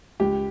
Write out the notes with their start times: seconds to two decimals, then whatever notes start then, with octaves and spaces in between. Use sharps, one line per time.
0.20 C#2 G4